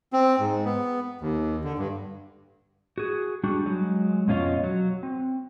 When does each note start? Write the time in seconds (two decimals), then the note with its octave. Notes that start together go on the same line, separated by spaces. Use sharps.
0.13 C4
0.39 G#2
0.65 B3
1.21 D#2
1.64 D3
1.78 G2
2.98 F#4 G#4
3.44 G3 D4 F#4
3.66 F#3 G#3
4.28 F2 B2 C#4 F4 C#5 D#5
4.64 F#3
5.03 C4